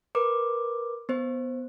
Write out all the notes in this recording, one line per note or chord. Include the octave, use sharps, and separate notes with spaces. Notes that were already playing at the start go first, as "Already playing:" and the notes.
A#4 B4 D6
B3 C5